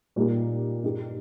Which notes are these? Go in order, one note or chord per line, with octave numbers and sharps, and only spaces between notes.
A#2 G3 A#3 D#4 G4
G2 G3 D#4 G4